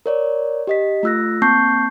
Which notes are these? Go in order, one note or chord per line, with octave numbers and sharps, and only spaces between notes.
A#4 C#5 D5
G4 D#5 B6
A3 F4 E6 F#6 A#6
A#3 C4 A5 C#6 G6 C7